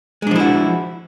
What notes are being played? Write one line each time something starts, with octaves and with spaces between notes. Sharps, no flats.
F3 G#3 D4 E4 F#4